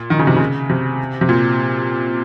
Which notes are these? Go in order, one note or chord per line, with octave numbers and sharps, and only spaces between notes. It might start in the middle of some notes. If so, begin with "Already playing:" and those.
Already playing: A#2
D#3
C#3
C3
C#3
C3
C3
A#2